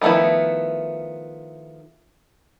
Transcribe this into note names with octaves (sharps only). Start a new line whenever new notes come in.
D#3 F3 A3 B3 E4